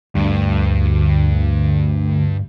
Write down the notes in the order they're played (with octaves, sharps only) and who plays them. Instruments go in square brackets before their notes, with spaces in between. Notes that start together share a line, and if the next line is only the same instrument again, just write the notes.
[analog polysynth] D2 [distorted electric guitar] G2